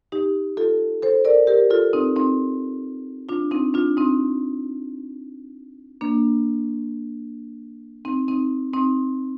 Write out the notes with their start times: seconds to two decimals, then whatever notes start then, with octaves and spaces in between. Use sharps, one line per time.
0.12 D#4 G4
0.57 F4 A4
1.02 A4 C5
1.25 A#4 D5
1.47 G4 A#4
1.70 F4 A4
1.93 C4 D#4
2.16 C4 D#4
3.29 D4 F4
3.51 C4 D#4
3.74 D4 F4
3.97 C4 D#4
6.01 A#3 D4
8.05 C4 D#4
8.28 C4 D#4
8.73 C4 D#4